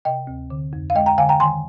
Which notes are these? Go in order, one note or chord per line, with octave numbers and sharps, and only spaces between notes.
C3 D#5 G5
D2
D3
F2
F5
G#3 D#5 G5
G5 A#5
D3 F5 G#5
G5 A#5
D#3 G#5 C6